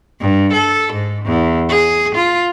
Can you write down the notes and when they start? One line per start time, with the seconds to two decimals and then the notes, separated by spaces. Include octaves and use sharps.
0.20 G2
0.52 A4
0.92 G#2
1.25 E2
1.69 G#4
2.14 F4